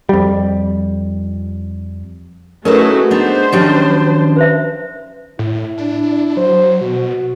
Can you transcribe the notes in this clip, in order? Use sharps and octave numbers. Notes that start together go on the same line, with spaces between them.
F2 G3
A3 C#4 D#4 E4 F#4 G#4 A#4 B4
B3 D4 D#4 C5
D#3 F3 F#3 C#4 D4 G4 D#5
B4 C5 E5
A2 E4
D4
F#3 C5
B2 F#4